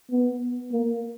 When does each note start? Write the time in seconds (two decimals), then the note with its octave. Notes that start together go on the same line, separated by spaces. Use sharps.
0.11 B3
0.72 A#3